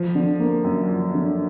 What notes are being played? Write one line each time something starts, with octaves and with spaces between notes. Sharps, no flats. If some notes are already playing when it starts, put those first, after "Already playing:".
Already playing: F3
D3
A#3
F#2
F3
D3